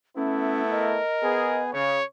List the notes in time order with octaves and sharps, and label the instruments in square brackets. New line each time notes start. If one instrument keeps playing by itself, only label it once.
[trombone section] A3 B3 E4 [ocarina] C#4
[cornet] A#4 [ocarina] D#5
[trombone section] B3 G#4
[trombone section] C#3 [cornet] C#5